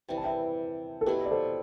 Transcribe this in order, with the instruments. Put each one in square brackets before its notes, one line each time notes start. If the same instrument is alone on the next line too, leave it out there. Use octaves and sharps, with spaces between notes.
[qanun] C3 E3 G3 [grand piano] G5
[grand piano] A5
E5 G5
A4
[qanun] B2 F#3 A3 E4 [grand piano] G4 B4
[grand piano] D5
A4 C5